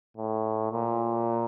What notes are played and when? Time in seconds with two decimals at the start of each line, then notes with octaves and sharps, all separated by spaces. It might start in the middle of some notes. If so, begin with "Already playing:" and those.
0.17 A2
0.72 A#2